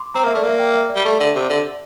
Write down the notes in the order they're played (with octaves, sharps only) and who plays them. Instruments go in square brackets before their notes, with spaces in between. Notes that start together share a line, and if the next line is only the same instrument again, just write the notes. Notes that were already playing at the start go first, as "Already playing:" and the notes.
Already playing: [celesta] C6 D6
[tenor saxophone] C4 [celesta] A#5
[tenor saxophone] A#3 [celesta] E5
[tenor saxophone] A3 [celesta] D5
[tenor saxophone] A#3
[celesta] E5
G5
E5
D5
[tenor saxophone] G3
[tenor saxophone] A3 [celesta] D5
[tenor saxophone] D3
C3
D3